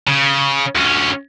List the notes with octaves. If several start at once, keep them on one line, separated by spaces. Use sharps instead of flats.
C#3
D2 C#4